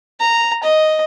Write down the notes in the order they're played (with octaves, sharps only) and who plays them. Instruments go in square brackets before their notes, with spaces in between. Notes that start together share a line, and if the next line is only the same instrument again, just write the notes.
[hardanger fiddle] A#5
D#5